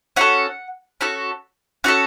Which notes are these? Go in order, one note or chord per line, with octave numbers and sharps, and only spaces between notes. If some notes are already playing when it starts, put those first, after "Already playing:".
C#4 F#4 A4 F#5
C#4 F#4 A4
C#4 F#4 A4 F#5